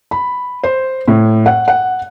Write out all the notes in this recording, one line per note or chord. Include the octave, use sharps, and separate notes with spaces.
B5
C5
A2
F#5
F#5